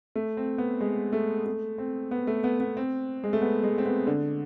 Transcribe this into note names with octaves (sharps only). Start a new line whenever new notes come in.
A3
C4
B3
G#3
A3
A3
C4
B3
A3
B3
B3
C4
G#3
A3
B3
G#3
C4
B3
D3